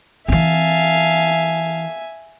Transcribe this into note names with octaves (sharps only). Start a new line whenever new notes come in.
E3 C4 E5 F5 G#5 A5